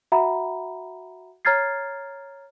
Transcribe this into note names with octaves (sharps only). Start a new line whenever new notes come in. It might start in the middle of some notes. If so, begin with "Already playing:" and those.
F#4 E5 F#5 A#5 B5
C#5 A#5 F6 G#6 A6 C7